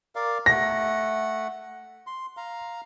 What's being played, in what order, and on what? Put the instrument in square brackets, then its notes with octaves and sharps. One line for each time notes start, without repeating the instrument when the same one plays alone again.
[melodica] A#4 D5 F5
[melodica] A3 F#5 [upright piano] A#6
[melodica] C6
F5 A#5